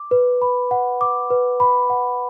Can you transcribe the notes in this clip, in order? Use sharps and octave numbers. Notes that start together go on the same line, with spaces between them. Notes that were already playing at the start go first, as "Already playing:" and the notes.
Already playing: D6
B4
B5
F#5
D6
B4
B5
F#5